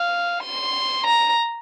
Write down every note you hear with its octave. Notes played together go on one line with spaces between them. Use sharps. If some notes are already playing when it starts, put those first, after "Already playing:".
Already playing: F5
C6
A#5